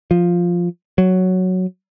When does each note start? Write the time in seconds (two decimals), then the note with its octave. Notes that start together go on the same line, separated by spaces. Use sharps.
0.11 F3
0.98 F#3